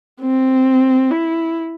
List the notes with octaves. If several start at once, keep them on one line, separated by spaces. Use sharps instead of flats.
C4
E4